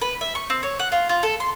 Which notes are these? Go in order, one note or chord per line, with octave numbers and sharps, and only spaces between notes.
B4
E5
C#6
C4
C#5
F#5
F4
F4
A4
C6